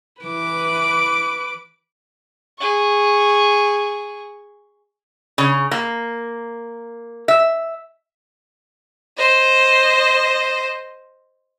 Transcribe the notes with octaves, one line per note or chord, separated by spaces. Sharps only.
E3 B4 D6
G#4 C#6
C#3
A#3
E5
C5 D#5